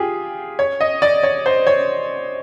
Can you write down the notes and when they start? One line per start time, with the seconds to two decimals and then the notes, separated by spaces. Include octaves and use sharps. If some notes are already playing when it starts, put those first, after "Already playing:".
Already playing: F4 G4 G#4
0.59 C#5
0.81 D#5
1.02 D5
1.23 C#5
1.46 C5
1.67 C#5